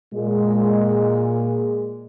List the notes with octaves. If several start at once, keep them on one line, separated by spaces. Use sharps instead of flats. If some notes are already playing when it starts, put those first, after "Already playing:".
A#2 G#3